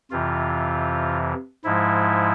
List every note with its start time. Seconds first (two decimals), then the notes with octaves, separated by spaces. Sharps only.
0.11 F2 C3 E3 F4
1.64 G#2 F3 G#3 E4